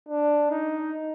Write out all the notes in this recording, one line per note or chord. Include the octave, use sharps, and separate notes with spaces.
D4
D#4